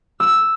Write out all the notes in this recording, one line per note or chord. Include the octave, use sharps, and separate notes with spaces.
E6